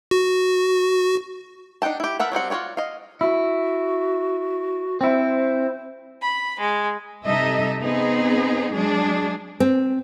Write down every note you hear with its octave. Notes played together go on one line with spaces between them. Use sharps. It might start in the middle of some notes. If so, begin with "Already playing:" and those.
F#4
D4 D#4 F#5 G5 A5
E4 G4
A#4 B4 E5 F#5 A5
F#3 G3 C4 F#5
F4 F#4 B4 C#5 D5
D#5 F5
E4 F#4
C4 E4 C5
B5
G#3
C3 G3 D#4 A4 D#5 E5
B3 C4 D#4 G#4
F#3 G#3 D4 G#4
C4